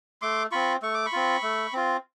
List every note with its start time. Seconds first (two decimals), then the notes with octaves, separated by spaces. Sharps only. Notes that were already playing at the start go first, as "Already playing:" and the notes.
0.22 A3 C6 D6
0.52 C4 F4 B5 C#6
0.82 A3 C#6
0.94 D6
1.05 B5 C#6
1.12 C4 F4
1.43 A3
1.73 C4 F4